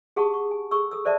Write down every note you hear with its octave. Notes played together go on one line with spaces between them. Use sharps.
G4 G#4 F#5 A5 C#6 D#6
C#6
G#5
G#4 A4 C#6 E6
A4 D#6 E6
A4 C5 D5 E5 A5